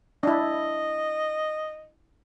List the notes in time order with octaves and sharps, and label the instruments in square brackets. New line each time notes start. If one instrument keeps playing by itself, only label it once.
[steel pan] D4 E4 [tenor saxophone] D#5